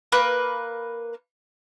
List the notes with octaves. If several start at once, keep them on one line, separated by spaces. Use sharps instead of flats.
A#3 A#4 B4 F#6